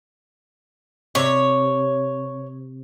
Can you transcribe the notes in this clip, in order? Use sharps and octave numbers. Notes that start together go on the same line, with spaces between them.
C3 C#5